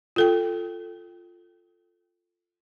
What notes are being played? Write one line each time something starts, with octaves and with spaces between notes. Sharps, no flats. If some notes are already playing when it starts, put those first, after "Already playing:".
F4 A4 G5